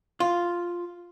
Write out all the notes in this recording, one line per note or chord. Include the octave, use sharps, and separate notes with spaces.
F4